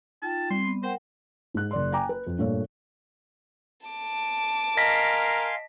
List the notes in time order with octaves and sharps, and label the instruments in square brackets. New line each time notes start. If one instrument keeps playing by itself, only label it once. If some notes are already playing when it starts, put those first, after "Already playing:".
[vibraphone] D#4 F4 G5 [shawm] A5
[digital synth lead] G3 [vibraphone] C4 [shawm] C6
[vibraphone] B3
[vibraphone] A#4 F#5 G5 [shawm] C5
[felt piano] G#2 F#6
F#1 D5 C6
G5 G#5 A#5 D6
B4
F2
G2 A#2 A3 C#5
[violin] A5 D6
[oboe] A#4 [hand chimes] D#5 A#6 B6 [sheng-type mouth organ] F5 G#5 C6